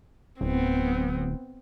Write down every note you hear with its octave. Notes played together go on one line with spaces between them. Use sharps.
D1 B3 C4